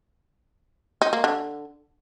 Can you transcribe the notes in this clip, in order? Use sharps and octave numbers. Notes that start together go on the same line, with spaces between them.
D#4
A#3
D3